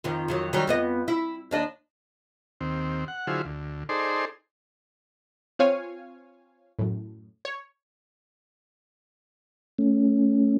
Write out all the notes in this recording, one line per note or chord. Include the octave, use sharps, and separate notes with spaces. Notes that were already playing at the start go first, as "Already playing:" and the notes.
F2 D#3 F3
F2 D#3 F#3
D#3 F#3 G3
F2 B3 D#5
E4
D#2 D4 D#5
D#2 C4
F#5
D3 F#3 E4 F4 G#4 C5
D2
D#4 G#4 A4 C5 D5 C6
C4 F4 C#5 F5 G#5
F#2 A2
C#5
A3 C#4